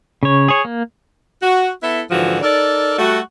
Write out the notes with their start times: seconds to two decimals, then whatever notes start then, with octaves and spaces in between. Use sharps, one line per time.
0.23 C#3 C#5
0.48 G#4 C#5
0.65 A#3
1.41 F#4
1.82 B3 E4 A4 E5
2.11 G#2 D3 E3 F3 F#4
2.42 D#4 A4 A#4 D5
2.98 G3 A3 F#4